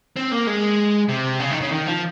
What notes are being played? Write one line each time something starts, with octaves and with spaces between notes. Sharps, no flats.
C4
A#3
G#3
C3
C#3
D#3
C#3
D#3
F3